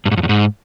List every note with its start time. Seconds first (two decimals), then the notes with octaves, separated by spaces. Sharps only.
0.06 G2
0.11 G#2
0.17 F2
0.23 E2
0.29 G#2